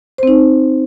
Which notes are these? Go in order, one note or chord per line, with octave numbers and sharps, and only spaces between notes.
C4 D#4 C5